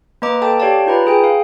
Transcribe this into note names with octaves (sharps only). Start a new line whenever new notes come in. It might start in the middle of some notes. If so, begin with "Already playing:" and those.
A#3 B4 D#5 A#5 D6
A4 G5 A5 D6
G4 C#5 D5 F5 G5 A5
D#4 F4 B4 A#5 B5
G#4 G5 G#5
F5